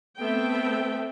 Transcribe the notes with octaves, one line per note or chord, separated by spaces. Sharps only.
A3 B3 C4 A4 E5 G5